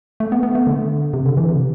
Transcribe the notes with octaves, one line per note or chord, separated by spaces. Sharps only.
A3
B3
B3
A3
D3
C3
D3
E3
C3